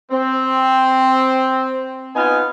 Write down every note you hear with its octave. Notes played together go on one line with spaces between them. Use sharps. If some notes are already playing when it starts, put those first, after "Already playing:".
C4
B3 D#4 F4 G#5